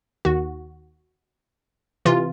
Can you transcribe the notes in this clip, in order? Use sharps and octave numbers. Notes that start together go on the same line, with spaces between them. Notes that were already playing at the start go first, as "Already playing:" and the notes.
D#2 D#3 F#4
C3 E3 F4